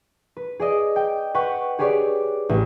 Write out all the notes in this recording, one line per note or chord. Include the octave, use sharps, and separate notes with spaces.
B4
G#4 D5 D#5
G5
B4 F#5 G5 C#6
G4 G#4 B4 C#5 D5
A1